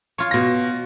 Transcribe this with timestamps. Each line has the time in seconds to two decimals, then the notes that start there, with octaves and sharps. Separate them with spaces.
0.18 F4 C#5
0.31 B2 A#6